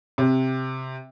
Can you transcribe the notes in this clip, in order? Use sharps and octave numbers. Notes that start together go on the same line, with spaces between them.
C3